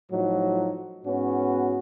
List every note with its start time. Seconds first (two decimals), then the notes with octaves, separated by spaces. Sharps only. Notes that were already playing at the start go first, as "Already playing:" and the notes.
0.12 A2 F3 F#3 D#4
1.05 G#2 B3 C#4 F#4